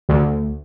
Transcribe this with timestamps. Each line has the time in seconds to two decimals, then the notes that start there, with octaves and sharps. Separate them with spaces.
0.09 D2